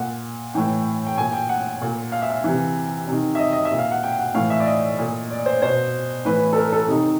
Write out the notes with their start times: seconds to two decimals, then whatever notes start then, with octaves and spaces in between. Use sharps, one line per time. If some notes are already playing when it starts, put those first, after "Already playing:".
Already playing: A#2 F#5
0.54 A2 E3 G5
1.07 G5
1.18 A#2 G#5
1.33 G5
1.49 F#5
1.82 A#2
2.12 F5
2.22 E5
2.31 F5
2.44 C3 E3
3.08 C3
3.13 D#3
3.35 E5
3.39 D#5
3.53 D#5
3.65 E5
3.72 A#2
3.78 F5
3.91 F#5
4.03 G5
4.19 F#5
4.34 A2 E3 F5
4.50 E5
4.60 D5
4.66 D#5
4.99 A#2
5.31 D5
5.46 C5
5.62 B2 C5
6.25 A2 E3 B4
6.53 A4
6.58 A#4
6.72 A4
6.88 C3 D#3 D#4